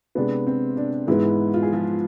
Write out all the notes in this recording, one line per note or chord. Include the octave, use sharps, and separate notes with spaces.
C3 G#3 B3 D4
C4
D4
G#2 E3 G#3 B3 E4
F4
G#4
F3 F4